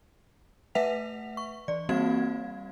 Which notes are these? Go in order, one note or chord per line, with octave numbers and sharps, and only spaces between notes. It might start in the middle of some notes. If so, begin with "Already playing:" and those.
A3 B4 E5 F#5 B6 F7
C#6
E3 D5
G3 A#3 C4 F#4 F5 G#6